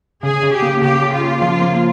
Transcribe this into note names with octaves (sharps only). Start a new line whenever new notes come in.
C#3 G#4
C#3
G4
A#3
C#3 G4
C#3
F4
C#3
F3
A#3